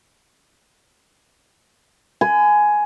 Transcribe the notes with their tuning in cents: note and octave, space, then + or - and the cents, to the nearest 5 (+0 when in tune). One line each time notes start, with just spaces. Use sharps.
G#5 +10 B5 +40